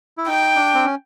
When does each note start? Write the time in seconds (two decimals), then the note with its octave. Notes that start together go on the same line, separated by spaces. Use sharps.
0.18 E4
0.28 D#4 G5
0.56 D4
0.74 C4
0.86 C#4